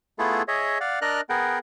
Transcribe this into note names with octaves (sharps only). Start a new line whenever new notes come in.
A3 B3 E4 F4 G#4 A4
G#4 C#5 D#5 E5
D5 F5 F#5
D4 A#4 D5 D#5 F6 F#6
B3 G#4 A#4 F#5 G5